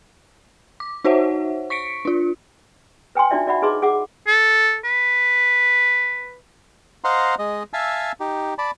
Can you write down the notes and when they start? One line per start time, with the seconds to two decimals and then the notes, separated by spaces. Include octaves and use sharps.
0.80 D6
1.04 D#4 F#4 C5 C#5 E5 F#5
1.70 C#6 B6 C#7 D7
2.05 D4 F4
3.15 B4 G5 G#5 C6
3.31 D4 D#4 F4 F#4 D5 E5
3.46 F#4 D5 E5 F#5 B5
3.62 D#4 G#4 B4 D#5 C6 D6
3.82 G#4 F#5 D6
4.27 A4
4.84 B4
7.04 C5 D#5 F5 F#5 A#5 C6
7.39 G#3 D#5
7.73 E5 F5 G#5 A5 E6
8.20 D#4 G4
8.58 D5 A5 B5